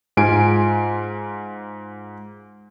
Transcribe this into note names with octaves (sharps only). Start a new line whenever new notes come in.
G#2 F4 G#5 D7